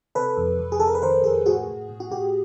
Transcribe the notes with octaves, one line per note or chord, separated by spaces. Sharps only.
C3 A4 B4
F2
F2
G#4
F2 A4
A#4
B4
D#3 A#4 C5
F2 G#4 A#4
A2 F#4 G#4
A2
A2
F#4
A2 G4